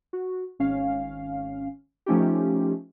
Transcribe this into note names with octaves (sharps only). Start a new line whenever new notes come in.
F#4
G#1 C#4 F5
F3 A3 C#4 D#4 F4 G4